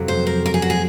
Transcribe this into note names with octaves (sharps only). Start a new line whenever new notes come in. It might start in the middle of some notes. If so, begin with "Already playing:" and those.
Already playing: F2 C3 F#3
C5
A#4
A#4
G#4
F#4
G#4